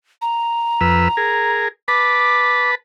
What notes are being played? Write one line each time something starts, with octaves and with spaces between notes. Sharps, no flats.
A#5
F2 B4 E6
G#4 A#4
B4 A5 B5 D6